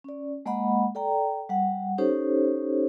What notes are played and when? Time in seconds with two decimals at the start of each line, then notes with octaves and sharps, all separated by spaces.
0.04 C#4 D5
0.46 G#3 A#3 D#5 F#5 B5
0.95 A4 D5 G5 A#5
1.49 G3 F#5
1.98 C#4 D#4 G4 A4 C5 C#5